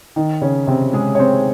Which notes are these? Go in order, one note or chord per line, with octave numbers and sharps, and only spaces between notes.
D#3 D#4
C#3 C#4
C3 C4
G#3 G#4
C#5
C4 C5